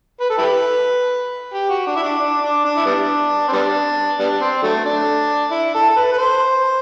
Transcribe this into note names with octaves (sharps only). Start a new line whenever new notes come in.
B4
A4
E4 G4 B4
G4
F#4
D4
E4
D4
D4
D4
D4
E4
G3 B3 D4
C4
G3 B3 D4
G3 B3 D4
C4
D3 F#3 A3
D4
E4
A4
A4
B4
B4
C5